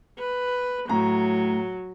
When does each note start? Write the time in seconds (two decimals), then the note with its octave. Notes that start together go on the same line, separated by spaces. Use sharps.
0.19 B4
0.89 A2 F#3 A#5